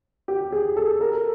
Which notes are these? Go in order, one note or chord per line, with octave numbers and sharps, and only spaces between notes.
G4
G#4
A4
A#4